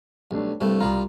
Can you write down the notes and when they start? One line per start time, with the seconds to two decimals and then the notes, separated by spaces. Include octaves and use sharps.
0.31 B1 G3 A3 D4
0.61 C2 G2 G3 A3
0.81 C2 G3 F4 A#5